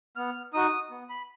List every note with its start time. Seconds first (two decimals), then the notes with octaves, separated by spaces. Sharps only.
0.16 B3 F6
0.54 D#4 F#4 D#6
0.91 B3
1.09 B5